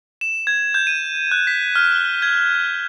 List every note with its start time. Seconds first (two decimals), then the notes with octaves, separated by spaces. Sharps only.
0.21 E7
0.47 G#6
0.74 G6
0.87 D#7
1.32 F#6
1.47 B6
1.76 F6
1.92 G7
2.22 G#6